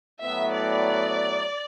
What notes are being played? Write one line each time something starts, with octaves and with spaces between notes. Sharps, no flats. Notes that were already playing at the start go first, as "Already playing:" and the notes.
A2 F#3 B3 E5
D5